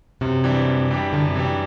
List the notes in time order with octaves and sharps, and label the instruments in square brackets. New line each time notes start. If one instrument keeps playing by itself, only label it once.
[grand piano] F#2 [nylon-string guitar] C3
[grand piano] E3 G3 D4 G4
F#2
E3 G3 D4 G4
[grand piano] F#2 [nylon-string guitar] D3
[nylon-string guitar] C3
[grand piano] E3 G3 D4 G4